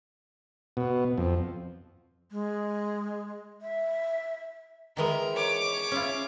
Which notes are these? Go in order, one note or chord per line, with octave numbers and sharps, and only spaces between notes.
B2
F2
G#3
E5
D#3 E3 G#3 A#4
C#5 D6
C#4 E4 F4